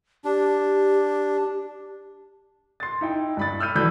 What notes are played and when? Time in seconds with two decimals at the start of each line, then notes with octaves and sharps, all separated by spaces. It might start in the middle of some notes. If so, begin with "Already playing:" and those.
0.25 D4 G4
2.80 C6 A6
3.01 D#4 E4 G5
3.37 G2 B5 A6
3.60 B5 E6 F6 G6 D#7
3.75 E3 F#3 A4 D5 B5 G6